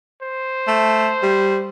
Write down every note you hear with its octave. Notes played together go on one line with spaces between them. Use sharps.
C5
A3
G3